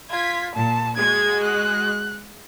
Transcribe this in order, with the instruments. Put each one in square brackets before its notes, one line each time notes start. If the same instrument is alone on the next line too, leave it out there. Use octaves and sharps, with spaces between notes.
[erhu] F4 [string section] G#6 B6
[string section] A#2 [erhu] A5
[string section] G#3 F#4 [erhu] G#6
[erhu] F#6